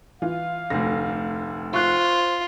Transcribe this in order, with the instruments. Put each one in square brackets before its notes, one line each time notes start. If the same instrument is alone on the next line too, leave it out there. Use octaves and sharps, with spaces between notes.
[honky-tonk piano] E3 F4 [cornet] F5
[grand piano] F1 D2 [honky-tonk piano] A#6
[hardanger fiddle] F4 [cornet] C5 [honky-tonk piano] C#6 F#6